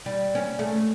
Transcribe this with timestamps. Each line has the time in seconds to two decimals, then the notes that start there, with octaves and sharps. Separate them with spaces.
0.06 G3
0.35 C#4
0.59 A3